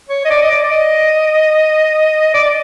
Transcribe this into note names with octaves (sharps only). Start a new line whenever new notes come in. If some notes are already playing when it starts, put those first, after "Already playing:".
C#5
D#5
D5
D#5
D5
D5
D#5
D5